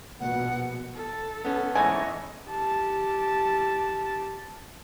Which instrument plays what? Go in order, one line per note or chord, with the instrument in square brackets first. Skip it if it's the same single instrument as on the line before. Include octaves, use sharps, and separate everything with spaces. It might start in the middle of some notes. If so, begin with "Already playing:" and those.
[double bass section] A#1 B2 [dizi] F#5
[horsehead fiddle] A4
[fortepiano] B3 C#4
[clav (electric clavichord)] G#2 E3 A3 [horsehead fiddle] C#5 D#5 [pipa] G#5
[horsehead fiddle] G4 A5